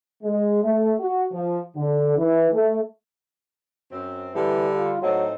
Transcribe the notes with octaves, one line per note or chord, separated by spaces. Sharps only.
G#3
A3
F#4
F3
D3
E3
A3
F#2 C4
D3 E3 G3
F4
A2 F#3 C4 D#4